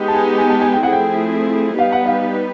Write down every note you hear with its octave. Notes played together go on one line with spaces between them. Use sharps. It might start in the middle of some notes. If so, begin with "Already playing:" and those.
Already playing: G#3 B3 D#4 G4
A5
G#5
G#5
A5
G#5
G5
F3 A3 C4 E4 G#4 F#5
G5
G3 B3 D#4 G4 B4 F5
F#5
F5